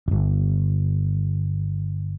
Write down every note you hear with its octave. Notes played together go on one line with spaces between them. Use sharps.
D1 G1